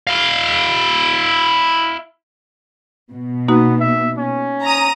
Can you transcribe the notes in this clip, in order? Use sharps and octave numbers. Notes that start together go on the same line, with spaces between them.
E4 F5
B2
A#3 B3 D#4 F#4
E5
C#4
A#5 D#6